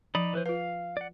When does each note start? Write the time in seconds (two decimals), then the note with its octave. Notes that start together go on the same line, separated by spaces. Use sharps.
0.15 F3 D#4 D5 B5
0.33 E3 B4 C5
0.46 F4 B4 F5
0.97 D5 F#5